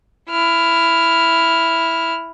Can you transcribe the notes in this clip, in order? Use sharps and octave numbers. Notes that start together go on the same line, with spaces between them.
E4 F6